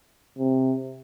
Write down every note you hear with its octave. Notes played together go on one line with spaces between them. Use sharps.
C3